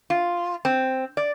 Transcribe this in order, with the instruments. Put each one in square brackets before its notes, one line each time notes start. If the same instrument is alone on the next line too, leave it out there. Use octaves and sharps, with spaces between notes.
[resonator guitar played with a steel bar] F4
C4
D5